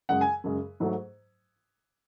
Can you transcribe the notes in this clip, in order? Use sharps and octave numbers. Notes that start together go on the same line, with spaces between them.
F#2 C#3 G#3 F#5
G#5
F#2 C#3 G#3
G#2 F#3 A3